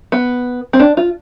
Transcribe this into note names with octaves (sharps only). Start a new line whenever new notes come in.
B3
C4
D4
F4